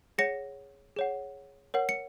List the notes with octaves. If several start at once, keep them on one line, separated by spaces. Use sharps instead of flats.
G#4 C#5 F#5 A#6 C#7
G#4 C#5 F#5
A#4 C#5 F#5
C#7